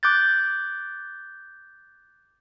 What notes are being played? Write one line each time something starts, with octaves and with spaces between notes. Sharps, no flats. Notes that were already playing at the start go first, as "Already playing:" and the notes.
D6 F#6 G6 A6